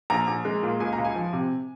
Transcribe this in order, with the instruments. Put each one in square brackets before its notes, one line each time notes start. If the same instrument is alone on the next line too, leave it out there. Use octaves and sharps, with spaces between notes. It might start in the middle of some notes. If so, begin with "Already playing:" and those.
[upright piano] A#1 A#5
A#1
G#3
A#2
C#2 G#5
A#5
C#2
G#5
F3
C3